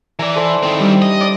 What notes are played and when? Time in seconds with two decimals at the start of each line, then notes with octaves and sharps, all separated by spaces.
0.19 E3 D5 G#5 A#5
0.36 E4 A4 C5
0.63 D#3 C4
0.79 G3 D4
1.02 D#5
1.21 D5